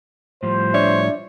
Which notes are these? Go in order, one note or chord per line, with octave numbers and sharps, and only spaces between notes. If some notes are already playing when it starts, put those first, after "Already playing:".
A2 F3 G3 C5
D4 C#5 D5 E5